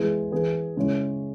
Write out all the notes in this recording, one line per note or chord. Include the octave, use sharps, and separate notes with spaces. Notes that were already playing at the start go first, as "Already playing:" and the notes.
Already playing: E3 G#3 B3 E4 G#4
E3 B3 G#4 B4
C#3 G#3 C#4 E4 C#5